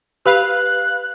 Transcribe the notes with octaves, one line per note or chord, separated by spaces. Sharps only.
G4 B4 F5 B5 F#6